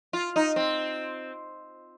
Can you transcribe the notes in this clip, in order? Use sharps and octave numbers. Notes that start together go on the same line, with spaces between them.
F4
D#4
C4